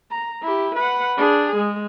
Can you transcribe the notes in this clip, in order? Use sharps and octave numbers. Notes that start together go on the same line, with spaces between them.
A#5
E4 G4
B4 F#5
D4 G#4
G#3